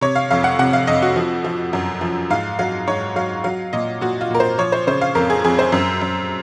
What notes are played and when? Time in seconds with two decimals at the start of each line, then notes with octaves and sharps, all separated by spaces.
0.01 C3 C#5
0.16 F5
0.31 F2 F5
0.44 F#5
0.59 C3 F#5
0.73 F5
0.87 F2 D#5
1.02 F#4
1.16 F3
1.44 F3
1.73 F#2
2.01 F3
2.30 G#2 F5
2.59 F#3 F5
2.87 G#2 C#5
3.16 F#3 F5
3.44 F#3 F5
3.73 A#2 D#5
4.01 A#2 F#4
4.21 F4
4.31 A#2 A#4
4.40 C5
4.58 F3 C#5
4.72 C5
4.87 C#3 C5
5.01 F5
5.15 F2 A#4
5.30 G#4
5.44 F2 G#4
5.59 C5
5.72 F#2
6.01 F#2